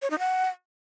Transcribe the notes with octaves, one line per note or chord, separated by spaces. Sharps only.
C#5
D#4
F#5